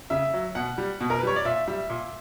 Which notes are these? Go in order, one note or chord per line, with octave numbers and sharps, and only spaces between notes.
C#3 E5
F#3
B2 F#5
G3
B2
A#4
B4
G3 C#5
D5
A#2 E5
G3 E5
A#2